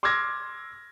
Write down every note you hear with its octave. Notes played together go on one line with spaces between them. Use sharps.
C6 D6 E6 F6 G#6 A#6